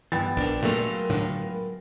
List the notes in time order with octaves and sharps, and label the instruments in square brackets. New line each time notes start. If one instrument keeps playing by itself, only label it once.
[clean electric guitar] G2 [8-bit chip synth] E3 [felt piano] B3 G5 A6
[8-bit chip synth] A#1 [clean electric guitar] D4 A#4
[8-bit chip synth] A#2 A3 [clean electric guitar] F#3 G#3 F4 [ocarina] A#4
[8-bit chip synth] A2 D3